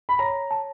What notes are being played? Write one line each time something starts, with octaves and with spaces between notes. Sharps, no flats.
B5
C#5 A#5
A5